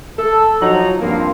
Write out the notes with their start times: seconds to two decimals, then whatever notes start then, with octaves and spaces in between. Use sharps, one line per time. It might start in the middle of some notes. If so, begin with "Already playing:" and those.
0.18 A4
0.61 F3 F#3 D#4 A#5
1.00 G2 F3 A#3 C4